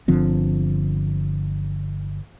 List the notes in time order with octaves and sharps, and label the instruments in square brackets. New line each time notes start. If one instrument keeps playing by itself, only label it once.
[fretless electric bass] G1 D3 F3 C4